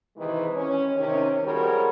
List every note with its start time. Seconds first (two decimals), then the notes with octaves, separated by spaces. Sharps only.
0.17 C3 D#3 E3 G#3
0.56 C#4
0.96 C3 D#3 C#4
1.44 F2 G3 G#3 F#4 A#4 C#5